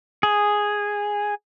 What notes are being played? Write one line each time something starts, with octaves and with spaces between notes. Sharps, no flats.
G#4